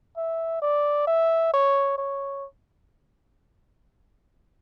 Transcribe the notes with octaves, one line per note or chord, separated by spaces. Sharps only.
E5
D5
E5
C#5
C#5